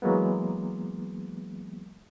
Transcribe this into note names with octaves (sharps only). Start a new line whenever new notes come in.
E3 F#3 G#3 A#3 B3